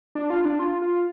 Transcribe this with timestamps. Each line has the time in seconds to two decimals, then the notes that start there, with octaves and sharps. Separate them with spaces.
0.15 D4
0.30 F4
0.45 D4
0.59 F4
0.82 F4